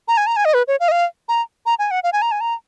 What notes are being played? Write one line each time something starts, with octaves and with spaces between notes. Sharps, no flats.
A#5
G#5
A#5
G#5
D#5
B4
C#5
F5
D#5
F5
A#5
A#5
G#5
F#5
F5
G#5
A#5
G#5
A#5